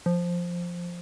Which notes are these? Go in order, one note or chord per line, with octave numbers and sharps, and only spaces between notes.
F3